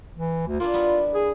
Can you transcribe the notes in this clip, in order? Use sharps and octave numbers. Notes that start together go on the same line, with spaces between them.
E3
D2
A#3 D4 E4 F4
G3 B3 E4
G#4